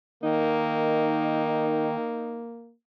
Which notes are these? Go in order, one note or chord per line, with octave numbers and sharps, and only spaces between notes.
D#3 A#3 D#4